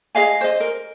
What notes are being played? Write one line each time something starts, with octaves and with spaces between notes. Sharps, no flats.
G#4 D#5 F5 G#5
C5 D#5
A#4